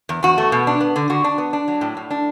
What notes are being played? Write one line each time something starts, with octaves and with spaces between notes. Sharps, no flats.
E2
E2 F#4
A3
B2
D4
B3
D3
D3 F#4
D4
B3
D4
F#3
A2
A2
D4